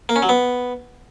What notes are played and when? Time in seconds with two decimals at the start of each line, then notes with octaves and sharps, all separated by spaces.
0.09 A#3
0.16 C#4
0.22 F#3
0.29 B3